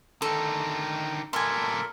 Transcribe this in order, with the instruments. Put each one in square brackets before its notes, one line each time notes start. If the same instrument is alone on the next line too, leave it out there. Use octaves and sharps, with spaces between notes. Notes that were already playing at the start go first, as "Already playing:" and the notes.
[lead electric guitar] D3 D#3 [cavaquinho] A4 [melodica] A#5
[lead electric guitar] G2 A#2 [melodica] A4 A#4 B5 [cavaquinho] G#5 C6